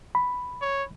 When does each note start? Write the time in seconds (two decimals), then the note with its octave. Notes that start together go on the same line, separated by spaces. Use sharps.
0.15 B5
0.61 C#5